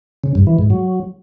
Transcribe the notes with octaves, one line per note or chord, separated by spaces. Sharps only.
C#3
G2
E3
G#2
F#3